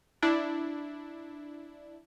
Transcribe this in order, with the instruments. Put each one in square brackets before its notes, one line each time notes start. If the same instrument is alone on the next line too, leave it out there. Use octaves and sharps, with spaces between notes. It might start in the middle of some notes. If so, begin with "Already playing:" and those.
[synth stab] D4 E4